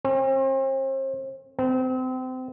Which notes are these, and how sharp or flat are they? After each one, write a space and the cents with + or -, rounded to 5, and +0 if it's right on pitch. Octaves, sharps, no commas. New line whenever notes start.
C4 +40
C4 -30